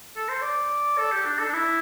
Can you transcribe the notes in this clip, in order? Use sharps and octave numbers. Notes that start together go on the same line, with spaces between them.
A4
C5
D5
A4
G4
D4
A4
D4
E4